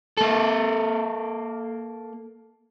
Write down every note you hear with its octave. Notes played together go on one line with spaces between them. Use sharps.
A#3 A4